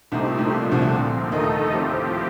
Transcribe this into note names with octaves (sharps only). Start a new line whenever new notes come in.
C2 C3 A3 C4 D#4 G4
A#2
A2
A#2 F3 A3 D4
A#2
C2 C3
D2 D3
A#2 F3 C4
D#2 D#3 A3 D#4 A4 D#5
A2 F3 C4 G4